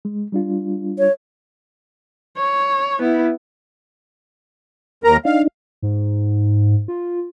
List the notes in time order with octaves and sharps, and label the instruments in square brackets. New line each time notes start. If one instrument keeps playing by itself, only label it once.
[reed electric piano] G#3
G3 D4 F4
[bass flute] C#5
[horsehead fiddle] C#5
B3 E4
[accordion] D#2 A#4 A#5
[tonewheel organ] D4 D#4 [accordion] F5
[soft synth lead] G#2
F4